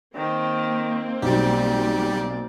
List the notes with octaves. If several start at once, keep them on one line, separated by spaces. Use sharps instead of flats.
D#3 A#3 C4
B1 G3 G4 D5